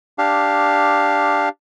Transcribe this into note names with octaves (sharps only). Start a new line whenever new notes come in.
D4 G4 F5